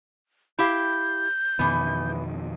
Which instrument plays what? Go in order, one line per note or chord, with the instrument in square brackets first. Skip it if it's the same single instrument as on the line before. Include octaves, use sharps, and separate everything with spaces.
[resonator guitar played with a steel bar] E4 G4 F5 [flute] G6
[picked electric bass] F2 B2 D#3 [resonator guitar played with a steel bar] E3 B3